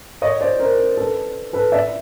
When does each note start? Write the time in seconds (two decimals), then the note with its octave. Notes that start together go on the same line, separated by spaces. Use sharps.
0.22 C#5 D#5
0.41 C5 D5
0.59 A#4 C5
0.97 A4 B4
1.53 A4 B4
1.72 D5 E5